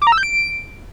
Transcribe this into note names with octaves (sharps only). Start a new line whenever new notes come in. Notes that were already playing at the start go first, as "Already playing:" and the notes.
D6
A#5
E6
G6
D7